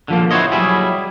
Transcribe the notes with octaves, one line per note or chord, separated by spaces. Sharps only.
D3 F3 A#3
E4 F#4 A#4 C5 C#5 D#5
F#3 G3 E4 G#4